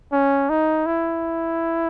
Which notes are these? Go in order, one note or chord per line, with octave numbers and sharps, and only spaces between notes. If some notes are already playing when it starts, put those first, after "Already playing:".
C#4
D#4
E4